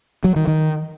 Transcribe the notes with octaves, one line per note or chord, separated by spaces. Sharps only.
F#3
D#3
D#3